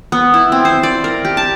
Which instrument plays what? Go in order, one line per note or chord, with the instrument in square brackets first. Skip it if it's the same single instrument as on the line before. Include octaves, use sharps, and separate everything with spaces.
[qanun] B3
E4
C4
C5
D5
A#4
G4
A5